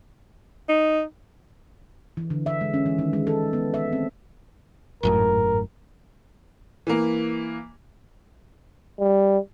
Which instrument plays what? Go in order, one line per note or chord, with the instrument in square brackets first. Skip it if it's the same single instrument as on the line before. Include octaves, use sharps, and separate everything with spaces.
[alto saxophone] D#4
[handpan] E3
D3
E5
G#3
C#4
E3
D#3
G#3
A4
B3
E5
C4
[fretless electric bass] G#1 F#2 A2 [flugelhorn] A#4
[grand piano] E3 A#3
[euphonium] G3